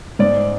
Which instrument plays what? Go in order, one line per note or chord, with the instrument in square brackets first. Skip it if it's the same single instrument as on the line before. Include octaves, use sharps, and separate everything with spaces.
[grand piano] G#2 D5